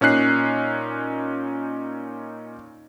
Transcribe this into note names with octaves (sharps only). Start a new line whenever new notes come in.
A#2 C#4 D#4 F#6 C7